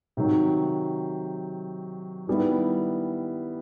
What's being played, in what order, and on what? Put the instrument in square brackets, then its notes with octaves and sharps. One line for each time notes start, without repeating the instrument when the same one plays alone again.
[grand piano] C3 D#3 F#3
D#3 G3 B3 E4